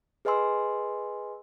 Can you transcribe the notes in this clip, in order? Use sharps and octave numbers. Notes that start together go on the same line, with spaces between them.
G#4 B4 D#5 G#5 C6 E6